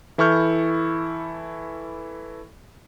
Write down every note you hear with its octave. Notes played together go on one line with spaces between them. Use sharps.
E3 E4 A4 C#6 F6 G6